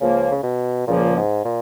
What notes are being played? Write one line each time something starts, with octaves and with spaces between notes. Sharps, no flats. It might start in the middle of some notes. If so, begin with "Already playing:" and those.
C#2 C#3 F3 A#3
C#3
B2
C#2 A#2 C#3 F3 A#3
G#2
A#2